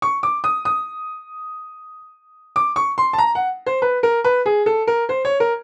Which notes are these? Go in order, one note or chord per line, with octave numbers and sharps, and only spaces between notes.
C#6
D6
D#6
D#6
D6
C#6
C6
A5
A#5
F#5
C5
B4
A#4
B4
G#4
A4
A#4
C5
C#5
A#4